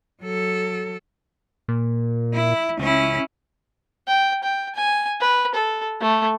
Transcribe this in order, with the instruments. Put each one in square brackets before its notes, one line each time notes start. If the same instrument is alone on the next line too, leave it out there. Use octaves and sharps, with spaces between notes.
[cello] F#3 A4
[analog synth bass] A#2
[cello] E4
[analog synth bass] C#2 [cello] C#4 E4
[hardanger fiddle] G5
G5
G#5
B4
A4
A3